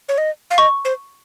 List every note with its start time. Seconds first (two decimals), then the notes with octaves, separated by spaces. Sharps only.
0.09 C#5
0.18 D#5
0.51 F5
0.58 D#5 C#6
0.85 C5